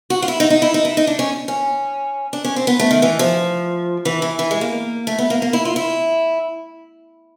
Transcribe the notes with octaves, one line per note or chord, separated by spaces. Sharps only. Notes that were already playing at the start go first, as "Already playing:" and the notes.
F#4
F4
E4
D#4
D#4
E4
D#4
E4
D#4
D4
C#4
C#4
D4
C#4
C4
B3
A3
D#3
E3
F3
E3
E3
E3
G#3
A#3
A3
B3
A#3
A#3
E4
F4
E4